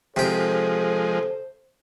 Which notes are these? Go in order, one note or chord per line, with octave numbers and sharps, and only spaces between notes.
C3 F3 G#3 G4 A4 C5